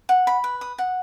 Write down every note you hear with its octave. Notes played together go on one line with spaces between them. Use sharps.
F#5
B5
B4
D#6
F#5